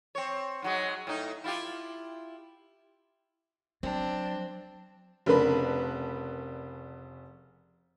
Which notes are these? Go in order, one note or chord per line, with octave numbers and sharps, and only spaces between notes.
C4 C#5
G#2 F#3 G#3
A2 D#4
E4 F4 G4
F#3 C4 D4
F1 C#3 D4 A#4 B4 B5